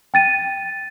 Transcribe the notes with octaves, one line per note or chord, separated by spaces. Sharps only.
G5 A6 D#7